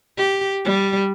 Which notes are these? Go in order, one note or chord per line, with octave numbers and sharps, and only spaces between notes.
G4
G3